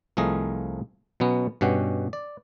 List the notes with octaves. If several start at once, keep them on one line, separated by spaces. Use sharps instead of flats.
C2 F3 A3 G#4 A#4 D#5
B2 F#3 B3 C#4
G2 B2 C#4 G4 F#5
D5